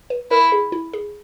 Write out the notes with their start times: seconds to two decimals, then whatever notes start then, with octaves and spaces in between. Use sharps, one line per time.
0.10 B4
0.31 E4 A#4
0.52 G#4
0.72 E4
0.93 G#4